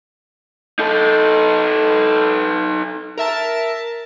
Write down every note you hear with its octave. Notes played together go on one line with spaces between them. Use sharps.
D#4 A4
A#4 E5 A5